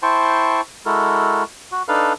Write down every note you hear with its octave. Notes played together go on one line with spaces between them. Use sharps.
E4 C5 G5 A5 C6 C#6
G#3 E4 F#4 A4 A#4
F#4
D4 D#4 A4 B4 F5